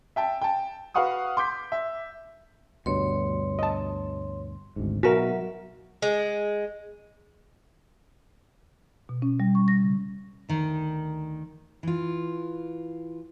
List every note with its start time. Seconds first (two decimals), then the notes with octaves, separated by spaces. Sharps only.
0.16 E5 G5 A5
0.41 G5 A5
0.94 F#4 B4 F5 F#5 C#6 D#6
1.37 C6 D6 G6 B6
1.72 E5
2.86 D2 G2 B2 C#5 C6
3.59 D#5 A5
4.76 G#1 D2 G#2
5.03 B2 F#3 F#4 A#4 E5
6.02 G#3
9.09 B2
9.22 C#4
9.40 G3
9.55 C#6
9.68 A#6
9.83 C#3
10.49 D2 D#3
11.83 E3 F4